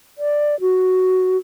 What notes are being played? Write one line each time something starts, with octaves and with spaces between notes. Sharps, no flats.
D5
F#4